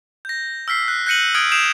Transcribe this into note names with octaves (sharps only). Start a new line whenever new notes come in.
G6 A#6
E6 F6 B6 C7
F#6
F#6 G6 A#6 C#7 D#7 F#7
D#6 F6 G6 G#6 D7 F#7
D#6 G6 C7 D7 E7 F7